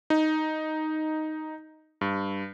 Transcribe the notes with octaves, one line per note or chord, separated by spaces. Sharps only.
D#4
G2